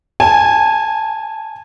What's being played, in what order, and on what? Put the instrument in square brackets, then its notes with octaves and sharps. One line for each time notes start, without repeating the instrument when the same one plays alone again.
[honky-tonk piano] G#5 A5